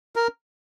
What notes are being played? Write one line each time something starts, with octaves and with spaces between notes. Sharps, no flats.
A#4